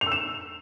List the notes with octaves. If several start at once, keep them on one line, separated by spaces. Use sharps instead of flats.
F7
E6
E7